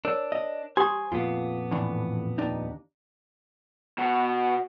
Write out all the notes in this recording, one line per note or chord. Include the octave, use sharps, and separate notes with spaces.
D4 A#4 C#5
D#5
G4 C5 G#5 C6 D#6
F2 A#2 B3 F4
A2 E3 D4
D#2 D4 D#4
B2 F#4